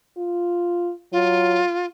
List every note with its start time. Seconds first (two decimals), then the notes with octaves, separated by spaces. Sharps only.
0.17 F4
1.13 F#3 F4